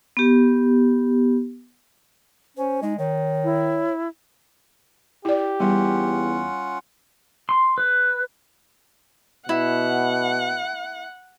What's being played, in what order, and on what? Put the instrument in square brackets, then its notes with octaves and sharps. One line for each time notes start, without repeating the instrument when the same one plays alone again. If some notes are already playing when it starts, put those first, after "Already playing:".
[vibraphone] B3 G4
[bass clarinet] C#4 [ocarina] C5
[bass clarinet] G#3 [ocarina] D#4
[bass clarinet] D#3 [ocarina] C#5
[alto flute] E4
[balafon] E4 D5 [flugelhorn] G4
[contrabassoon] E2 [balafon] G3 [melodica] C#4 F4 F#5
[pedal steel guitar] C6
B4
[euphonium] B2 [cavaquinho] E4 [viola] F#5